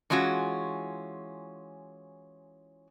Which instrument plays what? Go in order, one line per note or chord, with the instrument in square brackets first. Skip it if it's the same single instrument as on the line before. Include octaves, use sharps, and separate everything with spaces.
[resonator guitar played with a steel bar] E3 G#3 C#4 F4 F#4